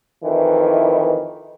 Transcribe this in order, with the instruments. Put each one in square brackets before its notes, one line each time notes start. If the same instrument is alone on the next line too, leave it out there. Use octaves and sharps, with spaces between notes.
[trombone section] F2 D#3 E3